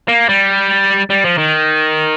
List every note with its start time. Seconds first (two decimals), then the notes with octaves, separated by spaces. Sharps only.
0.08 A#3
0.29 G3
1.10 G3
1.24 F3
1.38 D#3